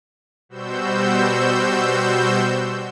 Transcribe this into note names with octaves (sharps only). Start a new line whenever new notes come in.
B2 G3 F#4 C5 E6 G6